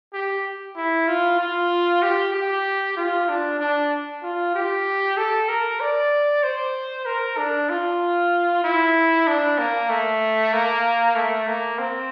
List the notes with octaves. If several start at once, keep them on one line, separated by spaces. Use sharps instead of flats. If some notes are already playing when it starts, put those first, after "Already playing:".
G4
E4
F4
F4
G4
G4
F4
D4
D4
F4
G4
A4
A#4
D5
C5
A#4
D4
F4
E4
D4
A#3
A3
A#3
A3
A#3
C4